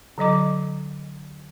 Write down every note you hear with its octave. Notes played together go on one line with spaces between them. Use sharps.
D3 F#3 D#5 D6